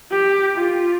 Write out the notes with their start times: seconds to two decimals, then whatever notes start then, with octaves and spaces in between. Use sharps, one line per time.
0.11 G4
0.55 F4